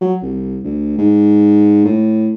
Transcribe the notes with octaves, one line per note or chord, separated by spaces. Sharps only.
F#3
C2
D2
G#2
A2